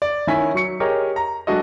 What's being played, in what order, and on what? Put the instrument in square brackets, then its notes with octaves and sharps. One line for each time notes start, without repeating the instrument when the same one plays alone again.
[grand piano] D5
D#3 C#4 E4 G#5 B6
F#3 C#6 C#7
G4 G#4 A#4 C#5 D#5
A#5
F#3 G#3 D4 F#4 A4 D#5